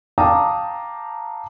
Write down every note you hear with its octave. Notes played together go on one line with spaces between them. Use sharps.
F5 G5 A5 A#5 D6 D#6